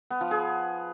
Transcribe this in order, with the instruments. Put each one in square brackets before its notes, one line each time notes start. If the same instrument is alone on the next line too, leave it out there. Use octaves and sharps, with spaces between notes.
[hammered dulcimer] B3
F3
G#4